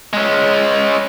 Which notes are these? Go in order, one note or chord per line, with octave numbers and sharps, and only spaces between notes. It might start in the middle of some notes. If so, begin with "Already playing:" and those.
G#3 C#4